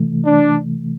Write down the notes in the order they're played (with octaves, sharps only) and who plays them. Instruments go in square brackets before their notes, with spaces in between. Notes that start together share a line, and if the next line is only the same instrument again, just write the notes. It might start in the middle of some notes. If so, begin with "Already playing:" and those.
Already playing: [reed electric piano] C3 E3 A3
[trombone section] D4